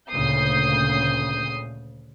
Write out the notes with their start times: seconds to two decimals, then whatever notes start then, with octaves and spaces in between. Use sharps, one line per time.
0.11 D2 A#2 C#3 D#6 G6 C7